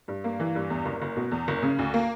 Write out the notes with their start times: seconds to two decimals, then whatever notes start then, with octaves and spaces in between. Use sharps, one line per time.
0.08 G2
0.24 A#3
0.40 E3
0.55 G2
0.70 E2
0.85 F#1
1.02 F#1
1.17 B2
1.31 E2
1.48 F#1
1.63 C#3
1.79 D2
1.94 A#3